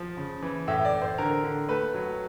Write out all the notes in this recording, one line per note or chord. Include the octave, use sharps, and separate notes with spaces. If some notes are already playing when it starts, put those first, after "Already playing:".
Already playing: F3
C#3
E3
A2 E5
D5
A2
C5
D3 A#4
D3
A3 B4
F#3